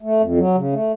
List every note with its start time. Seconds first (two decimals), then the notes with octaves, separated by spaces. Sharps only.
0.02 A3
0.20 F2
0.36 F#3
0.54 C#3
0.72 A3